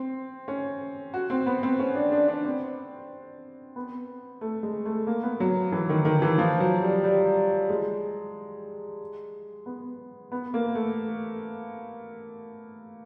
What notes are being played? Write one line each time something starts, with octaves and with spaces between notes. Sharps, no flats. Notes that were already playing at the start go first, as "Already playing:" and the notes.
Already playing: C4
C#4
F#4
C4
B3
C4
C#4
D4
D4
D4
C4
B3
A3
G#3
A3
A#3
B3
F#3
E3
D#3
D#3
E3
F3
F#3
G3
G3
G#3
B3
B3
A#3
A3